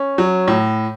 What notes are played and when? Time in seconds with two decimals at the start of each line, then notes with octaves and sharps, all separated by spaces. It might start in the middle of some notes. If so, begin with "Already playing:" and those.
Already playing: C#4
0.18 F#3
0.48 A2